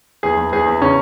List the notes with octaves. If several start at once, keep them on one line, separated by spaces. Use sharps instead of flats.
E2 G#4
E2
E2 G#4
E2
C#3 C#4